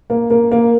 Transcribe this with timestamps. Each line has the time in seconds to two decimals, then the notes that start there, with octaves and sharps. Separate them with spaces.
0.10 A#3
0.30 A#3
0.52 A#3